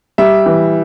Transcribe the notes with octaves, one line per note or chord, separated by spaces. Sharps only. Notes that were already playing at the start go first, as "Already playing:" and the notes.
G3 E5
E3